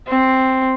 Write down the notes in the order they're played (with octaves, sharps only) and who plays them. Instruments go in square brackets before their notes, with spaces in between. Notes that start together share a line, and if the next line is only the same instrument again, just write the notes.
[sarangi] C4